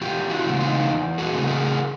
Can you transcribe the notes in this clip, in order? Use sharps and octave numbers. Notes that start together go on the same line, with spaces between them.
E2 F4 G4
E4 F#4
C#3 E3 A3 C4
D#4 F4
E2
F#4 G#4
C#3 E3 A3 C4
G#4 A#4